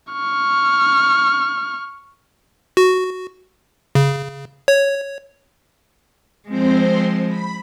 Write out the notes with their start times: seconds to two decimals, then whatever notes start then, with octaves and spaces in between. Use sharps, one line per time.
0.13 C#6 F6
2.77 F#4
3.95 C#3
4.68 C#5
6.49 F3 G#3 C4 C5
7.28 B5